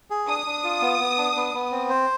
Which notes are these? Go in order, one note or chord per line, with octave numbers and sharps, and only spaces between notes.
G#4
D4 D#6
D4
F4
B3
B3
D4
B3
B3
C4
C5